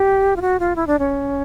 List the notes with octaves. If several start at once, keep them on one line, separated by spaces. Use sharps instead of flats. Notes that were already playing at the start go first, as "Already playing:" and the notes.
Already playing: G4
F4
F#4
F4
E4
D4
C#4